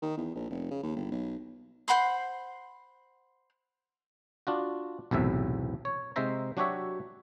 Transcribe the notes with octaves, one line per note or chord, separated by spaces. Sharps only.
D#3
E2
A#1
F1
C#3
D#2
G1
B1
C5 F#5 B5 C6
D4 F4 F#4
B1 E2 A2 C3 E5
C#5
C3 G#3 D#4 C5 E5 A#5
F#3 D4 F#4 G4 C#5 E5